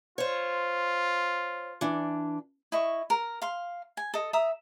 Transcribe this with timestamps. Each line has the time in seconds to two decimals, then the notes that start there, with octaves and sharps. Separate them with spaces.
0.18 F4 C5 C#5
1.81 E3 D4
2.72 E4 D#5 C#6
3.10 A#4
3.42 F5 C6
3.97 G#5
4.14 A4 D#5
4.33 E5 A#5 D#6